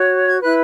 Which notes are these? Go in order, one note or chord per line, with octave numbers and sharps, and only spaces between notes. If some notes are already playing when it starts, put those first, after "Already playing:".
Already playing: F#4 C#5
G#6
E4 B4 F#6